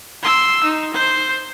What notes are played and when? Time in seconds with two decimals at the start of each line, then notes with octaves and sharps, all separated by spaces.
0.23 C6 E6
0.64 D#4
0.94 C5